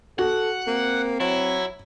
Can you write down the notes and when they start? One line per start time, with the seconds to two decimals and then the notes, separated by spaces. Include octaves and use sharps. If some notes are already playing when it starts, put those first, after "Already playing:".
0.19 F#4 A4 F#5
0.67 A#3 C4
1.20 F#3 E4